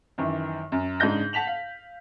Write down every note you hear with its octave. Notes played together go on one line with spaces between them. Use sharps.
F#2 D#3 E3
F#2
G#2 C#3 D4 D#5 G6 A#6
F#5 A5 B6 F7 F#7
F5